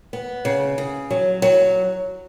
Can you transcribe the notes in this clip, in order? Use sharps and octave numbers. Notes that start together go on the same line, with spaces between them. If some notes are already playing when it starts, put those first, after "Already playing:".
B3
C#3
C#3
F#3
F#3